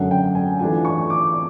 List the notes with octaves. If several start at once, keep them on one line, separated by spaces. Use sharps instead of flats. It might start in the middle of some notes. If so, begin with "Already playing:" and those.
Already playing: F#2 D3 F#3 A3 F#5
G5
G#5
E3 A3 D4 F4 G#5
C#6
D6